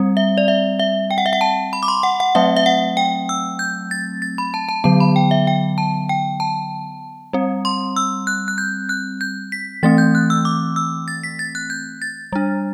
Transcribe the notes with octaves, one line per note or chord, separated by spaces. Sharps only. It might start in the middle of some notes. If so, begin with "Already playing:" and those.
Already playing: G3 C4
E5
D5
E5
E5
G5
F#5
E5
F#5
A5
B5
D6
C6
F#5
F#5
F#3 A3 C4 E5
E5
F#5
G5
E6
G6
A6
A6
B5
A5
A5
D3 F#3 B3 A5
B5
G5
E5
G5
A5
G5
A5
G3 C4
C6
E6
F#6
F#6
G6
F#6
G6
B6
E3 A3 C4 A6
G6
F#6
E6
D6
E6
A6
B6
A6
F#6
G6
A6
G3 D4